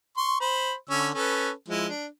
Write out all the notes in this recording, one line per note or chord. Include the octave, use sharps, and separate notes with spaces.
C6 C#6
C5 B5
D3 C#4 E6
C#4 A4 B4
F3 G#3 E4
D4